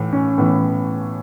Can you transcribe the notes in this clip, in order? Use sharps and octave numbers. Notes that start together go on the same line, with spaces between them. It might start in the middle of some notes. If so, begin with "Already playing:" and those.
Already playing: A2 E3
C#4
A2 E3 B3